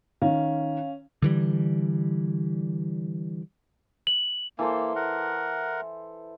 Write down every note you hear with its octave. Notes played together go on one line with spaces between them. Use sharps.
D#3 C#4 F5
D3 E3 G3
F#7
E3 A#3 A4 C5
A#4 F#5